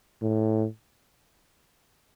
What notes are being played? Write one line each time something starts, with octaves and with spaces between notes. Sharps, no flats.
A2